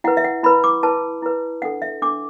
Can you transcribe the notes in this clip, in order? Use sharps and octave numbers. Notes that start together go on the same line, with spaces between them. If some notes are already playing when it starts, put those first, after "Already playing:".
E4 B4 F#5
E5
F#5
E4 B4 B5
D6
E4 B4 A5
E4 B4
D4 A4 F#5
E5
D4 A4 D6